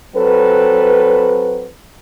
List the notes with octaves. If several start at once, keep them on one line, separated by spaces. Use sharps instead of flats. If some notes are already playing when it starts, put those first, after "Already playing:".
F#3 C4 A4 B4